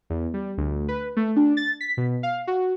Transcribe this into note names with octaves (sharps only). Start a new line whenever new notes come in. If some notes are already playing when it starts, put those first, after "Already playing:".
E2
G3
D2
B4
A3
D4
A6
B6
B2
F5
F#4